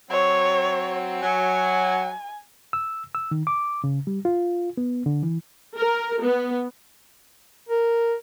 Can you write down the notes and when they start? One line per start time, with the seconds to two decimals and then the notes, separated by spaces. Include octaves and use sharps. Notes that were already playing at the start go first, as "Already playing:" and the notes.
0.10 F#3 C4 C#5
1.23 F#3 G#5
2.73 E6
3.15 E6
3.31 D#3
3.47 D6
3.84 C#3
4.07 G3
4.25 F4
4.77 B3
5.06 D3
5.23 E3
5.77 A#4
6.22 B3
7.69 A#4